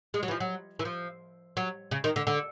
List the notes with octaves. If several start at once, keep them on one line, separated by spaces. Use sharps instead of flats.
G#3
F#3
E3
F3
F#3
E3
F3
F#3
C#3
D#3
D3
D3